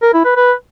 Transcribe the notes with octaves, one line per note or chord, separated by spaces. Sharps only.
A#4
E4
B4
B4